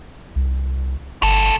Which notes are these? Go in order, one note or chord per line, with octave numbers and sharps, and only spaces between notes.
C2
G1 C2 A4